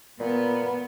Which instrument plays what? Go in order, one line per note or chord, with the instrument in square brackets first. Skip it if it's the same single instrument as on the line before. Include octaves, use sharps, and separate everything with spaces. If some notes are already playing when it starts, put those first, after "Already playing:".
[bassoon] A#2 [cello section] B3